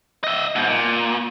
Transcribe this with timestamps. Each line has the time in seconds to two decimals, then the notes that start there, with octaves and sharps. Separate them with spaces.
0.24 D#5 E5
0.56 G#2 B2
0.68 A#2